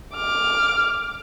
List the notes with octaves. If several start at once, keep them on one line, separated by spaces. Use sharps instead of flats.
D6 F6